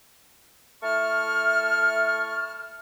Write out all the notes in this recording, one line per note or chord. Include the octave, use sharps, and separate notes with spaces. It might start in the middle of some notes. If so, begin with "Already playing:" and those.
A3 E4 A5 C#6 F6